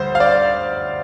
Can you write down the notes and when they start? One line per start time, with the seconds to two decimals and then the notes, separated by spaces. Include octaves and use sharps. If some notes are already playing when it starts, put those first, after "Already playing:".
Already playing: D2 G3 C5
0.15 F5
0.20 D5